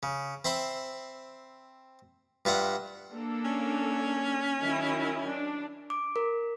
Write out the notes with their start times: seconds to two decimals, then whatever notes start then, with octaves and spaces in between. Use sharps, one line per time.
0.03 C#3
0.45 C4 E5 B5 C6
2.45 G2 F4 E5 F#5
3.13 A#3 D4 A4
3.44 C#4
4.62 D#3 F#3 E4
5.28 D4
5.90 D6
6.16 A#4